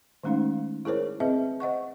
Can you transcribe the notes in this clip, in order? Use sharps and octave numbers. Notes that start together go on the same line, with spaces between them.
D#3 G#3 A3 C#4 D#4 F5
E4 G#4 A#4 C5 C#5
C4 G#4 B4 D#5 E5
C5 D#5 F#5 C#6